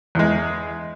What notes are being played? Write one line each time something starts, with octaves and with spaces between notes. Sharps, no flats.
E2 G#3